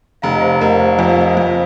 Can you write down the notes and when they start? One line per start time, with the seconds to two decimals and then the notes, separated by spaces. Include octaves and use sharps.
0.22 F1 F5 A#5
0.35 D#5
0.41 C5 F5
0.61 F1 A#4 D#5
0.80 C5 F5
0.99 F2 G#5
1.10 F5
1.21 D#5
1.32 F2 C5 F5